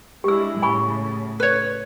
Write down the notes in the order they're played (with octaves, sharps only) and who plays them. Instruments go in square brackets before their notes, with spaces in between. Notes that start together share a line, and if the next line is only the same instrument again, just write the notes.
[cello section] G#3 D4 E4 [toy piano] G4 E6
[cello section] A2 C#3 [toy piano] G#5 B5 C#6
[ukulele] B4 C#5